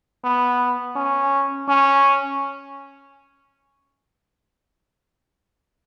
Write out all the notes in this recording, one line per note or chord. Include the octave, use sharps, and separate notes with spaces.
B3
C#4
C#4